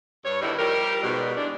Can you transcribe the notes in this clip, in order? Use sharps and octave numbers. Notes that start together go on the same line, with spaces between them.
G2 C#5
E2 D3 D#3 G3 E4 D#5
F3 G3 G4 A#4
G#2 B2 G3
E3 G#3 D4